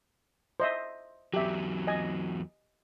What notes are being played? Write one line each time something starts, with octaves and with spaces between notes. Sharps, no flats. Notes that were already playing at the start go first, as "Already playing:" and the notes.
C5 D#5 E5
E2 F#3 G4 E5
D#5 G#5